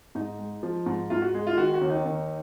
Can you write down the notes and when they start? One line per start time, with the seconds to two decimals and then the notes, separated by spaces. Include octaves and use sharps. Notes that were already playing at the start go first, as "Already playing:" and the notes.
0.15 G#2 D#4
0.39 G#3
0.63 F3
0.86 G#2
1.10 G#2 F4
1.22 F#4
1.34 G#3
1.47 F4
1.57 D#3 F#4
1.74 F#4
1.82 D#2
1.90 D#4
2.05 D#2